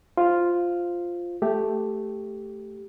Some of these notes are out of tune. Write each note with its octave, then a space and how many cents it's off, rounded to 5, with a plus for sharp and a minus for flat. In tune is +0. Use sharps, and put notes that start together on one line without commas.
F4 +0 C5 +0
A3 +0 G4 +0